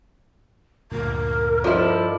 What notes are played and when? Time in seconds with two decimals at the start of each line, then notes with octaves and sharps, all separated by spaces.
0.92 D2 G2 A#2 A#4
1.64 G2 F3 A3 E4 F4 D5 D#5 C6